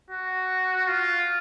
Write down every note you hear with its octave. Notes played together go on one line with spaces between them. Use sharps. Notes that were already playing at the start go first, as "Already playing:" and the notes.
F#4
F4